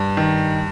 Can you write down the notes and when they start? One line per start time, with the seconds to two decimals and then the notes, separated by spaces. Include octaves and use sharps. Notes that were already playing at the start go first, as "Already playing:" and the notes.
Already playing: G2
0.17 D#3